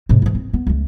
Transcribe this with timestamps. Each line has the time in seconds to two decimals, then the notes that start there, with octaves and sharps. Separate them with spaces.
0.09 G#2 C3
0.22 G#2 E3
0.35 C4
0.53 B3
0.67 C#2 A3